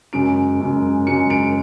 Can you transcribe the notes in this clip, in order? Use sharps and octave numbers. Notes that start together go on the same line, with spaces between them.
F#2 C#3 G#3 D7
F#2 C#3 G#3
F#2 C#3 G#3 C#7
D7